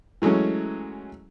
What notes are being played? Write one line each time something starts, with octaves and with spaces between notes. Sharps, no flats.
E3 F#3 G#3 A3 C#4